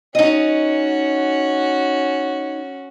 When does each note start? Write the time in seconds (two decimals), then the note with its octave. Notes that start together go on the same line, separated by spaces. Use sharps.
0.15 C#4 D#4 F#4 D#5